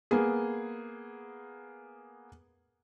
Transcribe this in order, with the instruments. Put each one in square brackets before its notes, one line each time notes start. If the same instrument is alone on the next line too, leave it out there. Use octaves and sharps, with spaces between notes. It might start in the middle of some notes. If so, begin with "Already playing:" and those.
[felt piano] A#3 B3 G#4